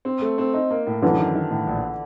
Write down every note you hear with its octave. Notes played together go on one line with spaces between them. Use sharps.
C4
A3
C4
D#4
A#3
A2
F#2 D3 E3
D#3
D#3
A2
A#1